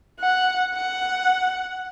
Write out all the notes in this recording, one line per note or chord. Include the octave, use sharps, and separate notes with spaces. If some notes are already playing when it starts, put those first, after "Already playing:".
F#5
F#5